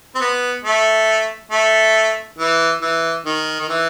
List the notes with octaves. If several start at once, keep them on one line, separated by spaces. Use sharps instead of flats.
C4
B3
A3
A3
E3
E3
D#3
D#3
E3